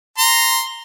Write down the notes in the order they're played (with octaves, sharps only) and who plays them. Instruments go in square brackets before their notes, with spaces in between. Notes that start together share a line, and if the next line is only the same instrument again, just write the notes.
[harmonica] A#5 C6